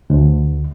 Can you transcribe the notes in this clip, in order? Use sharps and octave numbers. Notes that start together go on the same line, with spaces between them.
D2